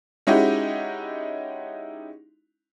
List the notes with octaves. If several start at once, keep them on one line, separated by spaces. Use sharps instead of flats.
G#3 C#4 D#4 E4 F#4 G4